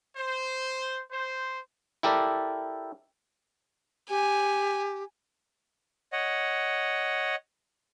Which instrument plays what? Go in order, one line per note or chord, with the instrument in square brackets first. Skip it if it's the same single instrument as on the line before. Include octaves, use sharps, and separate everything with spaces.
[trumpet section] C5
C5
[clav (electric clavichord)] E4 G4 A4 A#4 D5
[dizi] G4 [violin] G#5
[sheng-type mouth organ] C#5 D#5 F#5